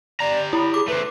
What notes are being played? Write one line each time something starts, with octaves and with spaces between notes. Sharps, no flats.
G4 D5 A#5
E4 B5
G#4 D6
A3 B4 C5